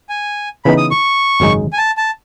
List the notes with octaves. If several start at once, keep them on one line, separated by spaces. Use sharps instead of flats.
G#5
C#3 E3 B3 D#4 B5
D#6
C#6
G#1 F#2 C#3 G#3 D#4
G#5
A5
A5